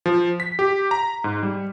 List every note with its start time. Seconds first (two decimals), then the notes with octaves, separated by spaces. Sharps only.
0.06 F3
0.40 B6
0.59 G4
0.91 A#5
1.24 G#2
1.43 G3